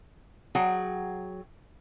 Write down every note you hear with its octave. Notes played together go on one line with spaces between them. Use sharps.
F#3 G#4 F#5 G5